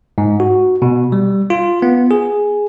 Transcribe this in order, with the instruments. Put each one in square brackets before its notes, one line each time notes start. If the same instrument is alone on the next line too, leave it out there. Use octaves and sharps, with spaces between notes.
[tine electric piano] G#2
F#4
B2
G3
F4
B3
G#4